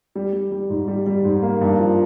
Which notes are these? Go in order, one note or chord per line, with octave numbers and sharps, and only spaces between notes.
G3
G3
G3
G#2
G3
G3
G#2
A#3
G2
F3